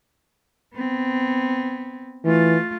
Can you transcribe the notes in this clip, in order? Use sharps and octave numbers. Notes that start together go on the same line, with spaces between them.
B3 C4
E3 A3 F4